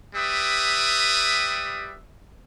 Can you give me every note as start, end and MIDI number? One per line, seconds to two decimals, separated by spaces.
0.15 1.96 55
0.15 1.96 67
0.15 1.96 71
0.15 1.96 76
0.15 1.96 87